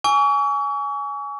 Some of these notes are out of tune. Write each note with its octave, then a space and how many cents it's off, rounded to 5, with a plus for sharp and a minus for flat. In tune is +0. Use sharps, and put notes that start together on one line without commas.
G#5 +0 C#6 +40 E6 +10